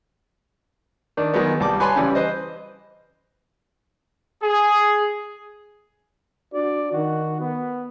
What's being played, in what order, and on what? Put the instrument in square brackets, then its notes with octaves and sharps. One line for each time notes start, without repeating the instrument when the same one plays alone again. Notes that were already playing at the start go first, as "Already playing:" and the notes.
[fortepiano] D#3 D4
D#3 F#3 G#3 B3
C2 G3 A5 D6
B4 C#5 G#5 A5 B5 C6
C#3 E3 G3
B4 C5 D#5
[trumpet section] G#4
[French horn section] D4 F#4 [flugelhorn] D5
[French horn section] D#3 [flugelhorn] F#4
[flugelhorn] B3